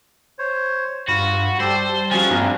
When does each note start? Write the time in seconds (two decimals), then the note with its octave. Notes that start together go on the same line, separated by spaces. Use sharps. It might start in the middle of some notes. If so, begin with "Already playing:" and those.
0.39 C5 C#5
1.08 G2 F4 F#4 B5
1.60 G3 A4 C5 D5 G5
1.79 A5
2.11 F3 C#4 F4 F#4 G#4 G#5
2.31 G2 A#3 C4 D4 F5 G#5 A#5